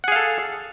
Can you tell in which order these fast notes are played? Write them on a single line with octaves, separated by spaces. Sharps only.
F#5 G#4 F5 A4